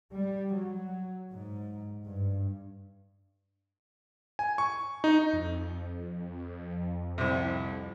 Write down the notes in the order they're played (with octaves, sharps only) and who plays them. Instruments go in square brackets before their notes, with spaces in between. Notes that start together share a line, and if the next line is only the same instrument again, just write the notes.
[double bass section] G3
F#3
G#2
G2
[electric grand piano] G#5
C#6
D#4
[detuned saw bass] F2
[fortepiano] C2 C3